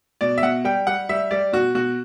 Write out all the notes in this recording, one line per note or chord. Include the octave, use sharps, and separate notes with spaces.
B2 D5
E5
B2 F#5
G3 G5
G3 F#5
G3 E5
G3 D5
B2 F#4
B2 F#4